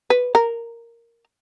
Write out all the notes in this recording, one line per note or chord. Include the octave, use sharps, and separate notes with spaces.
B4
A#4